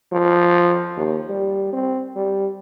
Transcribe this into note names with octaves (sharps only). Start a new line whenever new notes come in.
F3
D#2
G3
C4
G3